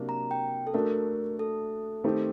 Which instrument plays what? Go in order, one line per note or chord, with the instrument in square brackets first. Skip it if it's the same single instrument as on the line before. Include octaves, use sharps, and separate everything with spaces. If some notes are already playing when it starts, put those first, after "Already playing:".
Already playing: [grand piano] C3 F#3 A#3 D4
[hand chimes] A#5
G5
A4
[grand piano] A3 D4 F#4 [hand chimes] A#4
[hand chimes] A4
[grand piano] D#3 A3 C4 D#4 G4